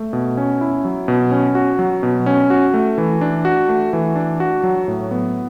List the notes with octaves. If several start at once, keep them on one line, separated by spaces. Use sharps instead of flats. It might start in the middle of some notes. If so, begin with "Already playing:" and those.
Already playing: A3
B2
C#4
E4
F#3
B2
C#4
F#4
F#3
B2
C#4
F#4
A3
E3
D4
F#4
A3
E3
D4
F#4
F#3
A2
B3